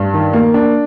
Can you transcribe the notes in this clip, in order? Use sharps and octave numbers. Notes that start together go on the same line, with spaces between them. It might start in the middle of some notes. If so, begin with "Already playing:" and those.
Already playing: G2
D#3
A#3
D4